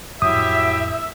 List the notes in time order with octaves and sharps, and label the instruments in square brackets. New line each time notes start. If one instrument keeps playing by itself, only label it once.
[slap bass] F2 A2 A3 [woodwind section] F#3 E4 G4 [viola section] E5 [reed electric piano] D#6